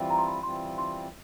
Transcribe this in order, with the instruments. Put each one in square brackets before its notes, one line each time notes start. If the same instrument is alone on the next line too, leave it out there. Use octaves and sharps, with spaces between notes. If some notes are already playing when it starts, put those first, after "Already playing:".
Already playing: [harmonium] E3 G3 C4 F4
[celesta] A#5
C6
B5
[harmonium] E3 G3 C4 F4 [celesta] C6
[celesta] C6